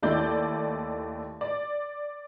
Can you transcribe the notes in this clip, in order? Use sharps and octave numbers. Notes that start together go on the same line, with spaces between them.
D#2 A3 E4 D5 G6
D5